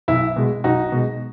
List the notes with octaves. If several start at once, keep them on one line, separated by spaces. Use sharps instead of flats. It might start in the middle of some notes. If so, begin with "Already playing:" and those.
B1 E4
B2 G#3
B1 D#4 F#4
B2 G#3